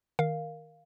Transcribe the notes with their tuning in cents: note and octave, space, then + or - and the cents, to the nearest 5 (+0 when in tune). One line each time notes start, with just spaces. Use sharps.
D#3 +0 A#4 +0 F5 +0